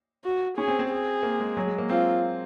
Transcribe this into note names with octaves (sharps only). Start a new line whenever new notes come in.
F#4
C#4 G#4
C4
C4
G#4
A#3
G#3
F#3
G#3
A#3
C4 F4